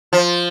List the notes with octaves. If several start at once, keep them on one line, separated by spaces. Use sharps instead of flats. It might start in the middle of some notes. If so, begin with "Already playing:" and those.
F3